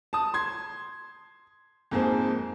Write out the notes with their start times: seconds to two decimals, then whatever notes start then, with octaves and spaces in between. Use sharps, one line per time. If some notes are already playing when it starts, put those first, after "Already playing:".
0.13 A5 D#6
0.34 C6 G#6
1.91 F2 G#2 A#3 G#4 C5